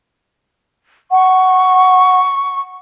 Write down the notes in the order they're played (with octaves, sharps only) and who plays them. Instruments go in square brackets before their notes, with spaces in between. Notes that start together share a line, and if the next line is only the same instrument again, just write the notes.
[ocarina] F#5 [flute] C#6